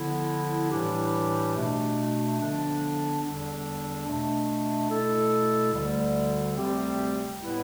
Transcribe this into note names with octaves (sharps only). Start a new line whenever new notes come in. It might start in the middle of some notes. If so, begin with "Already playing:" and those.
Already playing: D3 F3 B3 E4
A2 E3 G3 D4 G4
B2 A3 D4
D3 F3 B3 D4
E2 D3 G3 D4
B2 A3 D4
B2 A3 E4 A4
D2 D3 G3
D2 C3 G3 C4 G4
A2 G3 B3 E4 B4